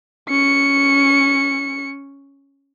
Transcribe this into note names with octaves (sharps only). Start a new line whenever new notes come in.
C#4 C#7